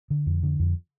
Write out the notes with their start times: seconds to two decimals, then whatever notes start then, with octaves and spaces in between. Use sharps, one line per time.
0.10 D3
0.26 F2
0.43 D3
0.60 F2